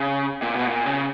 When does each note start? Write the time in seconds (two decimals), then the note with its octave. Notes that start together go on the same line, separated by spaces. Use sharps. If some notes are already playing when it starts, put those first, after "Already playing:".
Already playing: C#3
0.42 A#2
0.55 B2
0.67 A#2
0.86 C#3